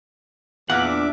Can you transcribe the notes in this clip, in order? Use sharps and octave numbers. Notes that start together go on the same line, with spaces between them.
E2 A#2 E5 F#5 D6
D4